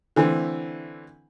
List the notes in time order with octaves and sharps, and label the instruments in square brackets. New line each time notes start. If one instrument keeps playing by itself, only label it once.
[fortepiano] D3 E3 A3 C4